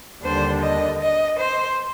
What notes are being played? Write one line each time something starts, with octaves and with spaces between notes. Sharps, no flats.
D#2 D3 G3 D4 C5
D#5
D#5
C5